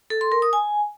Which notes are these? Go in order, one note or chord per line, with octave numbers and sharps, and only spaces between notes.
A4
C6
A#4
D#6
G#5